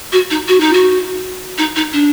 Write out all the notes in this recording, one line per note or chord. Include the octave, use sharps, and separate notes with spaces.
F#4
D#4
F#4
D#4
F#4
D#4
D#4
D4